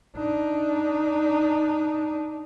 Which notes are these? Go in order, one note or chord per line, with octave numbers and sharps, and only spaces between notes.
D4 D#4